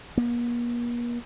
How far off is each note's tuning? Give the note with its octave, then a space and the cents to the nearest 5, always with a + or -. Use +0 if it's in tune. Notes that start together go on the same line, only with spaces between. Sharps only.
A#3 +45